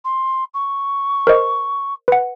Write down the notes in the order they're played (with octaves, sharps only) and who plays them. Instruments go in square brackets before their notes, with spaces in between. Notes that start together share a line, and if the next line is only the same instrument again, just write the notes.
[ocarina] C6
C#6
[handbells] A#4 C5 D#5
B4 F#5